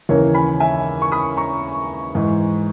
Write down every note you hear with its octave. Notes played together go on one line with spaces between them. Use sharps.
D#2 C#3 E3 A#4 C#5
G#5 B5
E5 G#5
C#6
B5 D#6
A#5 C#6
G#2 E3